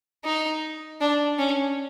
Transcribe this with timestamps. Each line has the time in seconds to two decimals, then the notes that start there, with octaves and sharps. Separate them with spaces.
0.25 D#4
1.01 D4
1.39 C#4